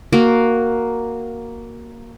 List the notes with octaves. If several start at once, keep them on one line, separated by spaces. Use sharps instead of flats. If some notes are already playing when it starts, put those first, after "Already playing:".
A#3 F#4